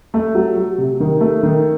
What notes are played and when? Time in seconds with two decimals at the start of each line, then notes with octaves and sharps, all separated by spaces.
0.14 A3
0.35 F#3
0.57 F#3
0.78 C3
1.00 D#3
1.21 A3
1.43 D#3